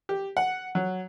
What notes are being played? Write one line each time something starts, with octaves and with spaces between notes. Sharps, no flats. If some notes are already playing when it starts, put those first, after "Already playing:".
G4
F#5
F#3